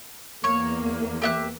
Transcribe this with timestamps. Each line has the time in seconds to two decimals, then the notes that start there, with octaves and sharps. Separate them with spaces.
0.44 E2 A#3 C#5 C#6
1.22 G4 E5 F#6